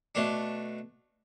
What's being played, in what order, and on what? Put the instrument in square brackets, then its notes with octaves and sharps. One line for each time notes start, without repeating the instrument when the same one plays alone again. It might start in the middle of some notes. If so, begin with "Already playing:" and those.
[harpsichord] B2 A3 D4